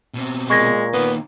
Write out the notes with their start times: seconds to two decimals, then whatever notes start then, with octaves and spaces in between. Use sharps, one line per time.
0.14 B2 C4
0.50 A#2 G#3 C#6 G#6 A#6
0.94 D#3 A#3 B3